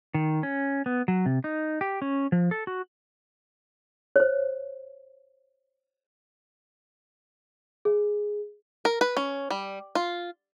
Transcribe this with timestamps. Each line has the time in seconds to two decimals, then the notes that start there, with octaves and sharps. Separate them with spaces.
0.14 D#3
0.43 C#4
0.86 B3
1.08 F#3
1.26 C3
1.44 D#4
1.81 G4
2.02 C#4
2.32 F3
2.51 A4
2.67 F#4
4.16 C5 C#5
7.85 G#4
8.85 A#4
9.01 B4
9.17 C#4
9.50 G3
9.95 F4